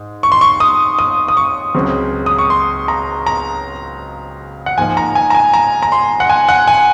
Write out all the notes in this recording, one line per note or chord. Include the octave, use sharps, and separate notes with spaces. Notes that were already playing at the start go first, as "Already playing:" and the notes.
Already playing: G#2
C#6
C6
C#6
D#6
D#6
D#6
C#6
C#2 C#3 F#3 C4
D#6
C#6
C6
A#5
A#5
F#5
G#2 F3 A#3 G#5
A#5
G#5
A#5
G#5
A#5
A#5
C6
F#5
G#5
F#5
G#5